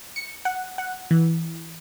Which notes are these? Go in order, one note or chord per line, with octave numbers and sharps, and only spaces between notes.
C#7
F#5
F#5
E3